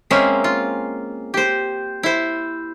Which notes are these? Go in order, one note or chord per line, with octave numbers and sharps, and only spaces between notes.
G#3 A#3 C4 C#4 E5 F5
F4
G4 C5
E4 C5